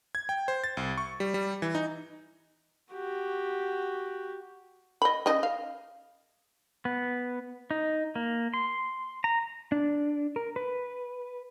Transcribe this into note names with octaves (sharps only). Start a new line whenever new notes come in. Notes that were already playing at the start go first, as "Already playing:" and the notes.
G#6
G5
C5
A6
C2
C#6
G3
G3
E3
D#4
F#4 G4
D#5 B5
C#3 D#4 D#5
F5
B3
D#4
A#3
C6
A#5
D4
A#4
B4